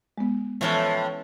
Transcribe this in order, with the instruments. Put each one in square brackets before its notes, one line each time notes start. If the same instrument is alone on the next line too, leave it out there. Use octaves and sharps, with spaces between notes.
[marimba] G#3 B3
[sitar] A2 F3 [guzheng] E3 C#4 A4